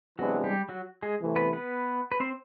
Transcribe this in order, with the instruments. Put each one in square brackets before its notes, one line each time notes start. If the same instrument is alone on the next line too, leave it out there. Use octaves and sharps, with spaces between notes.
[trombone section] C3 E3 G#3 B3 D4 [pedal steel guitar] F#3 F#4
[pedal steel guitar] G3 G4
F#3 F#4
G#3 G#4
[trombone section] C2 C3 E3 A3
[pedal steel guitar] B3 B4
B3 B4
B4
C4 C5